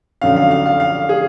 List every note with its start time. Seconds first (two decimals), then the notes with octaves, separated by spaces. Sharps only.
0.22 F2 D3 F#3 C#4 F5
0.36 F5
0.51 F5
0.66 F5
0.80 F5
1.09 G#4